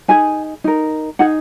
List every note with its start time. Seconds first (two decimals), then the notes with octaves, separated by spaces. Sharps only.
0.08 D#4 G#4 G#5
0.64 D#4 A#4
1.19 D#4 G#4 F#5